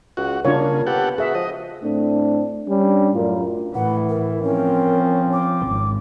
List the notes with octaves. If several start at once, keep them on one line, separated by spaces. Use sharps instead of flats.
C#2 F#4
C#3 A#3 D4 F4 C#5
B3 G4 A4 F#5
F#4 G#4 E5
F3 D#5
A2 A3 C4 D4
G3 C#4 D4
F#2 A2 D4 F4 A#4
A2 E3 E4 F#5
A#4
F3 C4 C#4 A#4
D6
G#1